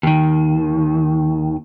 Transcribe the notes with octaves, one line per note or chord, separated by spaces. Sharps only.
D#2 D#3